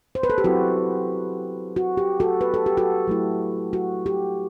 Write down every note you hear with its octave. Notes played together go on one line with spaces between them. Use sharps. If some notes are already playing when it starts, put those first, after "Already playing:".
C5
B4
A4
G4
F#3 C4 E4 F#4
F#4
G4
F#4 A4
B4
A4
G4
F#4 A4
F#3 A3 E4
F#4
G4